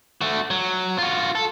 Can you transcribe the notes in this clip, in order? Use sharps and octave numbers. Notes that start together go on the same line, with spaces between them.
A3 F#4
F#3
F4 F#4
A4